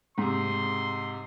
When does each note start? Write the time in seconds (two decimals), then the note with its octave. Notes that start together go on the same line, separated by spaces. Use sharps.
0.18 G#2 C3 C6